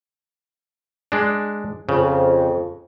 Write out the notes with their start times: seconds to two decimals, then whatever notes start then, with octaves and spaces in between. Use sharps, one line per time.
1.12 G#3 D4
1.89 F2 C#3